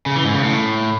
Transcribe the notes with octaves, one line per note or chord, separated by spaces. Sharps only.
C#3
E3
G#2
C#3
A2